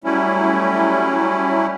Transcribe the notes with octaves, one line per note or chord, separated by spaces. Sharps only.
F#3 G3 A3 C#4 E4